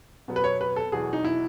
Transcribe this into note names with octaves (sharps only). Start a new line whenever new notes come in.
B2 F#3 B3
B4
C#5
B4
A4
E2 B2 F#3 G#4
D#4
E4